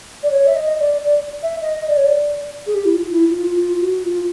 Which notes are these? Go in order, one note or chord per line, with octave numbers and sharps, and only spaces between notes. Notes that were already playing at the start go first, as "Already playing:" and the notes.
D5
C#5
E5
D#5
D5
D5
E5
D#5
D#5
D5
C#5
D5
G#4
G4
E4
F4
E4
F4
F4
F#4
F4